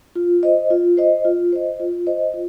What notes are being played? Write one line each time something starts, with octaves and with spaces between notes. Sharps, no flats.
F4
C5 D#5
F4
C5 D#5
F4
C5 D#5
F4
C5 D#5
F4